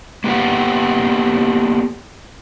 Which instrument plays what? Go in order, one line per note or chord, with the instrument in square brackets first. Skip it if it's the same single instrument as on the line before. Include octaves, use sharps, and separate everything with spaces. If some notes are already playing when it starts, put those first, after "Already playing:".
[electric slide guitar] A#3 B3 G4 A4 F#5